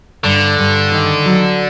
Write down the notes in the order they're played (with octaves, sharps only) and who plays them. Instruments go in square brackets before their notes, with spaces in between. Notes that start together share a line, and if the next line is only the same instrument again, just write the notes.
[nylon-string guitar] G2 [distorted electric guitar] D3
[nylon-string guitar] G2
D#3
F#3